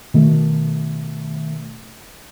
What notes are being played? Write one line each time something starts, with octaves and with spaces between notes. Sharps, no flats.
B2 D#3 A3